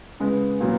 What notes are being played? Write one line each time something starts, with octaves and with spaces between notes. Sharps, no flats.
C#3 G#3 B3
A#2 F#3 B3